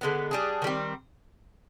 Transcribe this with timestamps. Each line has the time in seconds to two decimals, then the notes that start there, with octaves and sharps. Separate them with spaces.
0.01 D3 G#3 B3
0.31 G3 D4 G#4
0.62 D#3 G3 C4